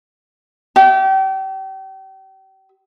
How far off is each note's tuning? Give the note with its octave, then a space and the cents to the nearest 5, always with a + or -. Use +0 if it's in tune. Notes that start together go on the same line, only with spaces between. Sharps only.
G4 -35 E5 +0